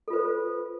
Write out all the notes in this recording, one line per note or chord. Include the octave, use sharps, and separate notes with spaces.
F4 A4 B4 C5